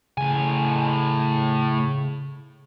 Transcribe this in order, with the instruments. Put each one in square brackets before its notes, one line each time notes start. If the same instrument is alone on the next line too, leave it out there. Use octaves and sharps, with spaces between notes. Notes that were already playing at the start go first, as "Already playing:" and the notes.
[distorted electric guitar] A2 G#5 [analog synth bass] C#3